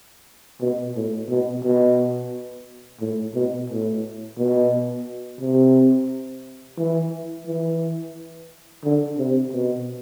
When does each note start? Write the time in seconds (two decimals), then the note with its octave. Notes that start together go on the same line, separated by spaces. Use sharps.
0.61 B2
0.95 A2
1.29 B2
1.63 B2
3.01 A2
3.35 B2
3.70 A2
4.38 B2
5.41 C3
6.78 E3
7.47 E3
8.84 D3
9.18 C3
9.53 B2